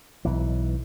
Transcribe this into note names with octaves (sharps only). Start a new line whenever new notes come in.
B1 E3